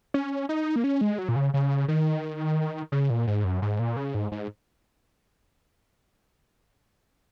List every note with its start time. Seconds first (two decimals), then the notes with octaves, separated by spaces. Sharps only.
0.14 C#4
0.49 D#4
0.76 A#3
0.84 C#4
1.01 G#3
1.18 F#3
1.29 A#2
1.36 C#3
1.54 C#3
1.88 D#3
2.92 C#3
3.10 A#2
3.27 G#2
3.44 F#2
3.62 G#2
3.79 A#2
3.97 C#3
4.14 G#2
4.32 G#2